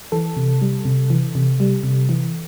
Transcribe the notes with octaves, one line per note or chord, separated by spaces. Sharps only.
E3 A4
C3
G3
C3
E3
C3
G3
C3
E3